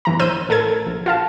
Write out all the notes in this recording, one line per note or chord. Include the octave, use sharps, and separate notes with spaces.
G1 E3 A#5
A#1 C5 E6 G6 D#7
A1 A4 A#4 G#6
A#1
F4 F5 A5